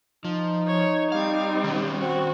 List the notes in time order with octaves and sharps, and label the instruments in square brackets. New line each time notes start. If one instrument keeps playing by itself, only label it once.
[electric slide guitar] F3 [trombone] D#4
[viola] C#5
[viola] G3 C4 [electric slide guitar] F5
[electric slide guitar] D#3 C#4
[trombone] C4 [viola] F#4